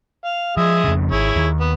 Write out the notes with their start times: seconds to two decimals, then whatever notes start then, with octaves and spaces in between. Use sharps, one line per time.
0.25 F5
0.57 F3 G#3 E5 D#6
0.85 F2 C#3
1.11 G#1 E4 G#4 C#5
1.36 D#2
1.60 B3